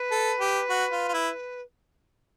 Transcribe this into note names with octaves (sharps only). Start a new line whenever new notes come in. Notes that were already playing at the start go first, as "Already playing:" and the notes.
Already playing: B4
A4
G4
F#4
F4
F4
E4